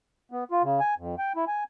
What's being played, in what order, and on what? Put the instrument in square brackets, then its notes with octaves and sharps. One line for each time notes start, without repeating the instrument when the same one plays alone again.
[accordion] B3
F4
C#3
G#5
F2
G5
E4
G#5